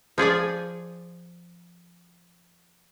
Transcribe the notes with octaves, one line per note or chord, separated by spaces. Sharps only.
F3 G#4 D5 G#5